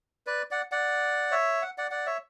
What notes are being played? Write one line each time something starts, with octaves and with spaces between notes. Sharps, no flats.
B4 D5
D5 F#5
D5 F#5
C#5 E5
F#5
D5 F#5
D5 F#5
C#5 E5